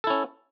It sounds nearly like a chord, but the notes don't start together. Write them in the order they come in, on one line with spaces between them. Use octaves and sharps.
A4 E4 C#4